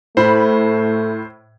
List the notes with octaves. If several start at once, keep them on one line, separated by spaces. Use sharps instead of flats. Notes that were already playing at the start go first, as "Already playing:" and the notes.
A2 A3 C5 B5